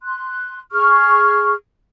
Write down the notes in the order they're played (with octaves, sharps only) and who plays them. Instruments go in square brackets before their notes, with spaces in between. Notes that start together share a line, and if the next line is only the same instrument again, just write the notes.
[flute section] C6 F#6
G#4 C#6 F6